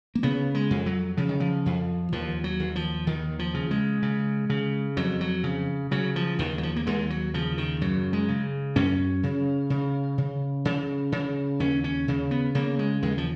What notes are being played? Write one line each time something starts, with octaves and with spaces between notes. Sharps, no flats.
A#3
C#3 B3
G#3
F2
F#3
C#3 F3
D#3
F3
F2
D#2 F3
F#3
D#2
F3
D#2 D#3
F3
C#3
G#3
C#3
C#3
F2 F#3
F#3
C#3
C#3 F#3
F3
D#2 D#3
F#3
F3
A#3
D#2 G#3
F#3
C#3 F3
D#3
F#2 F#3
G#3
C#3
F#2 C#4
C#3
C#3
C#3
C#3
C#3
D#2 C#4
C#4
C#3
B3
C#3 A#3
G#3
D#2 G#3
F3